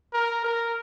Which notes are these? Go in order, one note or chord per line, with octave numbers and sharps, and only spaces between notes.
A#4
A#4